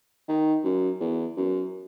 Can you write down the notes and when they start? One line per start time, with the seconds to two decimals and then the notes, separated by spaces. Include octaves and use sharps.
0.28 D#3
0.64 F#2
1.00 E2
1.37 F#2